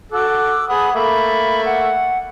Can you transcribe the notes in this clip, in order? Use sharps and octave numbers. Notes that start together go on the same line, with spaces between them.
F#4 A4 D6 E6 F#6
G#4 F#5 B5 D#6
A3 A#3 E5 B5
F#5